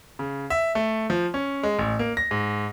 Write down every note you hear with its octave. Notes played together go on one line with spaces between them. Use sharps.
C#3
E5
A3
F3
C#4
G#3
A1
A#3
A#6
G#2